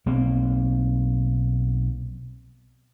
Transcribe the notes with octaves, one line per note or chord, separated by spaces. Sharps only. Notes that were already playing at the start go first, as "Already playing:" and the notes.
B1 A#3 C4